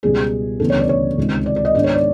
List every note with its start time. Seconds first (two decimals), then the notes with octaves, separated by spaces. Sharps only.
0.03 C#2 B2 G3 G#4
0.60 D2 C#3 E3 G3 B3 A4
0.70 C#5
0.79 D5
0.89 C#5
1.18 C#2 C3 D#3 G#3
1.46 D5
1.56 D5
1.65 D#5
1.75 G#2 D#3 G#3 B3 D4 D5
1.84 C#5
1.94 D5